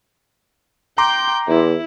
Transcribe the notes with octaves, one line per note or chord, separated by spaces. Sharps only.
G5 A#5 C6 D6 G6
E2 E4